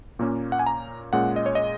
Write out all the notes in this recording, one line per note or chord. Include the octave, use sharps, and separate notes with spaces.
A#2 A#3 C#4
F#5
G#5
A#5
A#2 G#3 C#4 F#5
D#5
C#5
D#5